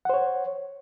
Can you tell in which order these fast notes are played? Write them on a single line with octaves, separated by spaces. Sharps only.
F#5 C5 C#5